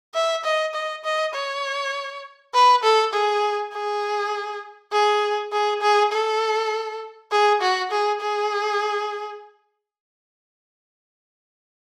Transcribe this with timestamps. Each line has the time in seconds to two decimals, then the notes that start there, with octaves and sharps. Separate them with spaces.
0.15 E5
0.44 D#5
0.74 D#5
1.05 D#5
1.34 C#5
2.54 B4
2.83 A4
3.13 G#4
3.73 G#4
4.93 G#4
5.52 G#4
5.82 G#4
6.12 A4
7.31 G#4
7.61 F#4
7.91 G#4
8.21 G#4